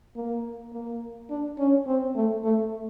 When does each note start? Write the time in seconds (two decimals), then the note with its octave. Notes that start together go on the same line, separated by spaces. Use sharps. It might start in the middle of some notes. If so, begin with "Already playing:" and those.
0.15 A#3
0.73 A#3
1.30 D4
1.58 C#4
1.87 C4
2.15 A3
2.44 A3